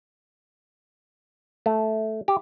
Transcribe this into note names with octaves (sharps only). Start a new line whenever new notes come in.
A3
G4